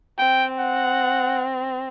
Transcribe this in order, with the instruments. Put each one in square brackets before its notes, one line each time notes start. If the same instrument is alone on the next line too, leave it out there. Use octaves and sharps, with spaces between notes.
[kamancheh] C4 [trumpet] G5
[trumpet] F#5